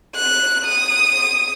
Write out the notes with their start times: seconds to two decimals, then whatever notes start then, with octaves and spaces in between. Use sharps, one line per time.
0.16 F#6
0.65 D#6